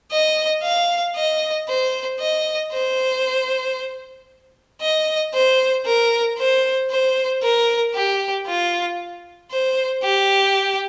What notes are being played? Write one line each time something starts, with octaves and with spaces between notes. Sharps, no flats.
D#5
F5
D#5
C5
D#5
C5
D#5
C5
A#4
C5
C5
A#4
G4
F4
C5
G4